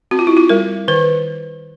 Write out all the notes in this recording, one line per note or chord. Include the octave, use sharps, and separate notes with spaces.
C4 F#4
F4
E4
F4
G3 A#4
D#3 B4